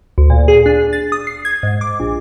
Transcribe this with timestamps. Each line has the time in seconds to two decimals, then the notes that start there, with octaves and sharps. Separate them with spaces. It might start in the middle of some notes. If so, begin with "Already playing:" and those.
0.18 D2
0.30 A#2
0.48 G#4
0.66 D4
0.93 A6
1.12 D#6
1.27 C7
1.45 G#6
1.63 G#2
1.81 D6
2.00 A#1